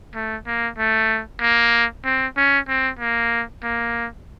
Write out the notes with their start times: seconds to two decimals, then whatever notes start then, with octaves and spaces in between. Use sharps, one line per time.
0.15 A3
0.47 A#3
0.78 A3
1.41 A#3
2.05 C4
2.37 C#4
2.68 C4
2.99 A#3
3.63 A#3